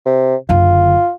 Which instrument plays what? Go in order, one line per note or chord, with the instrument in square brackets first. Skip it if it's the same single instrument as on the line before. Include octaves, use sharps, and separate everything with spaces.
[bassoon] C3
[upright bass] F#1 D3 [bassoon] F4